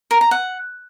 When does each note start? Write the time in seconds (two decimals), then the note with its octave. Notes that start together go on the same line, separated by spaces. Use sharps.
0.11 A#4
0.21 A#5
0.31 F#5